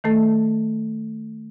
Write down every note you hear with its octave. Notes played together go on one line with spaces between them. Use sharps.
D#3 A3 A4